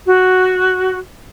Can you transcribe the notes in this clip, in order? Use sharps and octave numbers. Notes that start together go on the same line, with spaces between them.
F#4